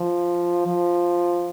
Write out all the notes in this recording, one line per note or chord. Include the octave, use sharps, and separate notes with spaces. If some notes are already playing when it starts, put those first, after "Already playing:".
Already playing: F3
F3